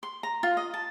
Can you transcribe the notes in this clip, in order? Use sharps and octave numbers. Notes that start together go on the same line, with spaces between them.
C6
A#5
F4
D#5
A5